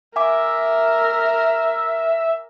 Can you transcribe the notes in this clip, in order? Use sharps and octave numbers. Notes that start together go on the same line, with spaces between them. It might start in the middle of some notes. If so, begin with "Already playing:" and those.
A#4 E5 G#5 D6